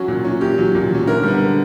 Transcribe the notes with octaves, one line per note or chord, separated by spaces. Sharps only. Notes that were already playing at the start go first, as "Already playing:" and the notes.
Already playing: F#3 C#4 F#4
A#2
F#3 C#4
A#2 G4
F#3 C#4
A#2
F#3 C#4
D3 A#4
G3 B3
D3